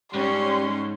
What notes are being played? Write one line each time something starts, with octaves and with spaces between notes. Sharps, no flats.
G#2 G3 C#4 C6